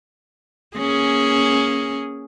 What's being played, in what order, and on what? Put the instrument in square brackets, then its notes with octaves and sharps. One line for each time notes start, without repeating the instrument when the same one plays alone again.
[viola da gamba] A#3 C#4 G#4